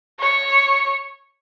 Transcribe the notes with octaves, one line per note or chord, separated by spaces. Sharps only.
C#5